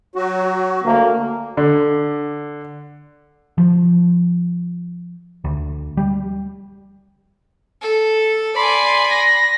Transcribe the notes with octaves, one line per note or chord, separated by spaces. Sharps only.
F#3 F#4
D2 A#3
D3
F3
D2
G3
A4
D5 G#5 B5 C6
A#6